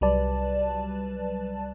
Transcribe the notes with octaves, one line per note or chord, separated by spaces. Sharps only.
C2 F#3 G3 B4 D5 A5